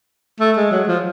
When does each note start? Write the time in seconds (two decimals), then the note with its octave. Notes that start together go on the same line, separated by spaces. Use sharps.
0.40 A3
0.57 G#3
0.71 F#3
0.87 F3